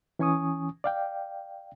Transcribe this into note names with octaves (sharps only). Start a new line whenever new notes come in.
E3 C#4 G#5 C#6 D#6
D5 F5 G5